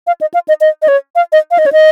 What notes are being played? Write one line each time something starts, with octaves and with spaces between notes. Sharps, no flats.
F5
D#5
F5
D#5
D#5
D#5
C#5
F5
D#5
F5
D#5
C#5
D#5